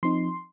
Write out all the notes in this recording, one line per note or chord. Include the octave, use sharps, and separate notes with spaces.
F3 C4 D#4 C6